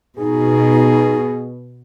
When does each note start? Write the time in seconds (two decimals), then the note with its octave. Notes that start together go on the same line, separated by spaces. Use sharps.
0.19 B2 D#4 G#4